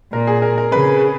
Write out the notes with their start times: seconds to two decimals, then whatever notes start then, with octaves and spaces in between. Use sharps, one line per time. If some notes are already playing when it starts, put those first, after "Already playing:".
0.13 A#2 A#4
0.27 G#4
0.42 A#4
0.58 A#4
0.72 C#3 B4